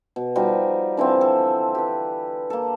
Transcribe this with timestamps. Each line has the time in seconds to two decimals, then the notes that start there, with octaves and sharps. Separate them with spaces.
0.16 B2
0.35 F3 G3 D#4 F#4
0.97 D3 E3 F3 C4
1.21 A4
1.75 G4 B4
2.50 A#3 A4